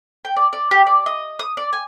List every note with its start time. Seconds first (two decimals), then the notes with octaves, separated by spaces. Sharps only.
0.25 G5
0.36 D5
0.53 D5
0.71 G4
0.87 D5
1.06 D#5
1.39 D#6
1.57 D5
1.73 G#5